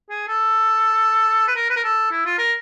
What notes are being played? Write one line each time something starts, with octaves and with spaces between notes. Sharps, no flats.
G#4
A4
B4
A#4
B4
A#4
A4
E4
F4
A#4